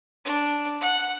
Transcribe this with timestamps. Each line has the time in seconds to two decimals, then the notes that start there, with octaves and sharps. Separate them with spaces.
0.25 D4
0.81 F#5